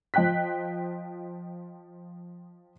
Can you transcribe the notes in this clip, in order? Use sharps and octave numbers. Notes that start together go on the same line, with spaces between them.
F3 D#5 G5 F#6 B6